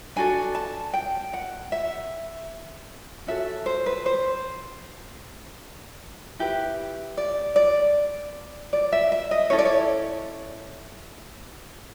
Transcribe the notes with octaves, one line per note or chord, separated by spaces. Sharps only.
D4 F#4 A4 G#5
A5
G5
F#5
E5
C#4 F#4 A4 E5
C5
B4
C5
E4 G4 B4
D5
D5
D5
E5
E5
D#5
C#4 E4 A4 C#5
D5
C#5